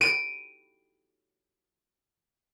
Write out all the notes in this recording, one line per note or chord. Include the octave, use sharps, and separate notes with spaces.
D7 D#7